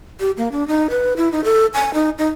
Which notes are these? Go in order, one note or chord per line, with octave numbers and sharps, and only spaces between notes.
G4
A#3
D4
D#4
B4
E4
D#4
A4
G#5
D#4
D#4